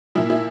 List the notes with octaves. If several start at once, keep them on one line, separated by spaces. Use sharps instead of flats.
A#2 F3 A#3 E4
E4